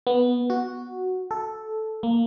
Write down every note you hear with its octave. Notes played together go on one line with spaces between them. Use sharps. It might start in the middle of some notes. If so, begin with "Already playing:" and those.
B3
F#4
A4
A#3